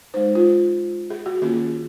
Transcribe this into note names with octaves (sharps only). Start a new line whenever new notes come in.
G#3 D#4 C5
F4
G#4
F#4
D#3 A#3 C#4 F4 G#4